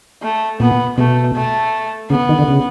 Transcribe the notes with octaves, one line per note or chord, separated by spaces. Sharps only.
A3
A#2 B3
B2 A3
A3
C#3 B3
D#3
D3
C#3